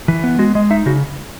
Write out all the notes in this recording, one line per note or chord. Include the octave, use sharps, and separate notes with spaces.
E3
B3
G#3 F#4
G#3 D#5
D#4 E5
C#3 F#4